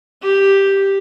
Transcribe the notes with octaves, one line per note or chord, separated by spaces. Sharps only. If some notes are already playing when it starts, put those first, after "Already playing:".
G4